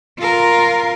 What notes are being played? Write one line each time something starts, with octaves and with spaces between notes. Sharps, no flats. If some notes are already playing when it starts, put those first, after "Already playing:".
F4 A#4